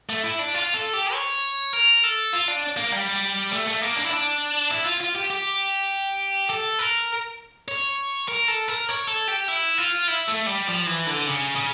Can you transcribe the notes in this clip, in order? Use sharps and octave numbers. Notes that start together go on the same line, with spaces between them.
A3
E4
D4
F4
A4
G4
C#5
A#4
A4
F4
D4
A#3
G3
A3
A3
A#3
D4
E4
D4
E4
F4
F4
G4
G4
A4
A#4
C#5
A#4
A4
A#4
C#5
A4
G4
E4
F4
E4
A3
G3
F3
E3
D3
C#3
C#3